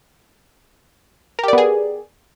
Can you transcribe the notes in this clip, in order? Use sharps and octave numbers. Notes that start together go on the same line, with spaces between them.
B3 G4 G#4 A#4 D5